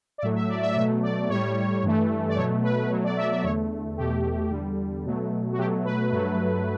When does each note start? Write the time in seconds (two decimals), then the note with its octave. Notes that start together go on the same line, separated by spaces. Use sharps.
0.18 D5
0.22 A2 F#3 A3 E5
0.36 E5
0.49 D5
0.63 E5
0.76 B2 F#3 A3 E5
1.03 D5
1.29 A2 G3 C#5
1.83 G2 E3 A3
2.29 D5
2.36 B2 F#3 A3 C#5
2.63 B4
2.90 B2 F#3 A3 C#5
3.04 D5
3.17 E5
3.31 E5
3.44 E2 D3 A3 C#5
3.97 E2 B2 A3 G4
4.51 E2 D3 G3
5.05 B2 F#3 A3
5.53 F#4
5.58 B2 F#3 A3 G4
5.85 B4
6.12 G2 F#3 A3